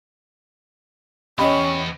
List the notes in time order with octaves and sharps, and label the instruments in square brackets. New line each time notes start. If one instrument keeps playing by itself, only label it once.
[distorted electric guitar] E2 B3 [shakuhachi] C#4 [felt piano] G4 D#5 B5